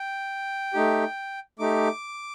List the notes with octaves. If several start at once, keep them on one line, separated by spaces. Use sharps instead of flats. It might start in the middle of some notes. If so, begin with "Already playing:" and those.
Already playing: G5
A3 D#4 G4
A3 D#4 G4 D6